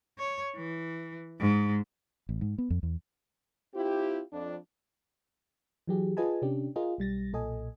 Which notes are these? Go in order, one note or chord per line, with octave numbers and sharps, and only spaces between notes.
C#5
E3
G#2
A1
G#2
B3
F2
E2
C4 E4 F4 G4
F2 D4
E3 F#3 G4 G#4
F4 G#4 B4 D#5 G#5 A5
C3 C#4 D4 G4
F4 G#4 A#4 D#5
B1 G3 A6 A#6
B1 A#2 A4 D#5 G#5